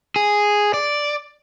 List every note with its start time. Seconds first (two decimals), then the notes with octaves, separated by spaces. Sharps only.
0.16 G#4
0.74 D5